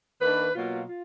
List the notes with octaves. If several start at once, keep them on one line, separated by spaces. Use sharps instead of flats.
D#3 A#3 D4 B4
B2 F#3 A#3 F4
F4